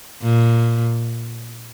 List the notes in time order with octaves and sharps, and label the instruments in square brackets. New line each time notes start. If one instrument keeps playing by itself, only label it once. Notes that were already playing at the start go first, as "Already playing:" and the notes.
[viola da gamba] A#2